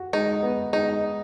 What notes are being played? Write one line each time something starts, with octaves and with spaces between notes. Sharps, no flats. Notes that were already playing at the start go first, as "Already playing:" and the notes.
Already playing: F#4
G#3 D#4
B3
G#3 D#4